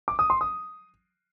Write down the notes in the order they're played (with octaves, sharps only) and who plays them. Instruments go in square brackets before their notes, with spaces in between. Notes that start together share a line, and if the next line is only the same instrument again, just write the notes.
[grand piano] D6
D#6
C6
D#6